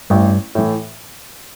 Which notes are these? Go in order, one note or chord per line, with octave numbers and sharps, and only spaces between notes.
A1 G2
A2 E3